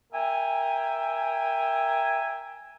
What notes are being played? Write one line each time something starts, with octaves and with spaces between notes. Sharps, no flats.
A#4 E5 G5 G#5